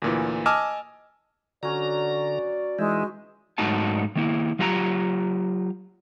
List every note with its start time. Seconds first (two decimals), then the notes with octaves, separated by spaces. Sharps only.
0.02 D2 A#2 E3
0.46 D#5 G#5 A5 D6 E6 F6
1.63 D3 F#3 C#4 D5 A#5
2.79 E3 G#3 D#4 E4
3.58 G#2 F#3 A3 D#4 F#4 A5
4.15 D#3 A#3 E4
4.59 F#3 F4 G4 F#5 A#5